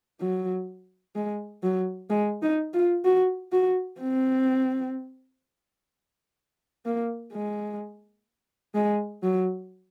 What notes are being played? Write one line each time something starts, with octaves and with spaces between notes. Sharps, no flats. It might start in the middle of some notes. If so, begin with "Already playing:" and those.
F#3
G#3
F#3
G#3
D#4
F4
F#4
F#4
C4
A#3
G#3
G#3
F#3